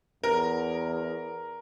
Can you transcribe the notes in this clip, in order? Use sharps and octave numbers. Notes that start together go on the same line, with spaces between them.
E2 A#4